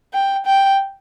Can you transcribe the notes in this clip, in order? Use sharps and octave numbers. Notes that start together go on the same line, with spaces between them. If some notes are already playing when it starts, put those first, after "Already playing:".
G5
G5